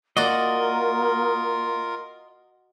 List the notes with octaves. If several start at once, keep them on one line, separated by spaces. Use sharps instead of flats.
A#3 F4 F#4 A#4 D5 D#5